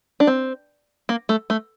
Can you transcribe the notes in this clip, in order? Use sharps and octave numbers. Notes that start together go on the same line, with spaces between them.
D4
C4
A#3
A3
A3